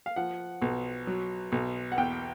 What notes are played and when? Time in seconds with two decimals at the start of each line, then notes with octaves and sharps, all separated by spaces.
0.06 F5
0.16 F3 F#5
0.62 B1
1.07 F#3
1.52 B1
1.92 F#5
1.98 E2 G5